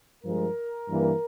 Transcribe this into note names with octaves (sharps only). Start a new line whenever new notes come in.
G2 F3 G#3 A#4
G2 E3 A#3